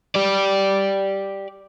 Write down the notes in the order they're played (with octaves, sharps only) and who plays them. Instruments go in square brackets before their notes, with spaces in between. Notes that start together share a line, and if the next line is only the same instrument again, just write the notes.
[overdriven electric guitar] G4 D5